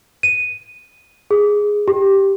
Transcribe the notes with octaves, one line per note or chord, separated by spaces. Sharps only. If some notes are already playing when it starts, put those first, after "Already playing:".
D#7
G#4
G4